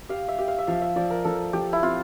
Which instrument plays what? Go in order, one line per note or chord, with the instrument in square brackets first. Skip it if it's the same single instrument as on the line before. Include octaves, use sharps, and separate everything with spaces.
[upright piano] G4 [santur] F5
[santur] E5
[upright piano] G4
[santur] F5
E5
[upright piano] F3 [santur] F5
[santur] E5
[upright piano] F3 [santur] D5
[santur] A#4
[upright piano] F3 [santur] A4
[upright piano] F3 [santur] G4
[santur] E4
[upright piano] C4 [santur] F4